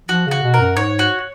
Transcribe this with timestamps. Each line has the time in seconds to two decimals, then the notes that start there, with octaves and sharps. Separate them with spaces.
0.09 F3 F#4
0.26 C#3 F#4
0.43 B2
0.54 A#4
0.60 F#2
0.77 G#2 C#5
0.99 F#4